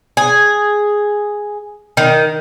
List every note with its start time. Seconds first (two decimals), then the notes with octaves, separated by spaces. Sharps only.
0.17 G#4
1.97 D#3